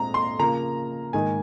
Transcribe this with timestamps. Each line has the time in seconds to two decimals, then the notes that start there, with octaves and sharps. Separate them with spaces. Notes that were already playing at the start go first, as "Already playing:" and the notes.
Already playing: A#2 G#3 C4 A#5
0.14 C6
0.39 C#3 F3 A#3 A#5
1.13 G#2 D#3 A#3 G#5